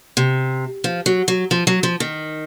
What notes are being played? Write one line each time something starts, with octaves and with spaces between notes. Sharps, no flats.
C3
F3
F#3
F#3
F3
F#3
F3
D#3